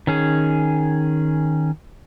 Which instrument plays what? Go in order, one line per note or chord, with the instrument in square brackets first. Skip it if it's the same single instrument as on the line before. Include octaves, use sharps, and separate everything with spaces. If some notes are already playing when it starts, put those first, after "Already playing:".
[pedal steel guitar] D#3 C#4 G#4